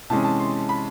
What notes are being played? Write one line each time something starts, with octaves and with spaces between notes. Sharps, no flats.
C3 E3 G#3 C#4 A5
A5
C6
B5